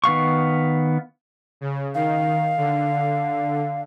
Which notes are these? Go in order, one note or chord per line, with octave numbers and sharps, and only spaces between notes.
D#3 B3 F5 C#6
C#3
D#3 F5
D3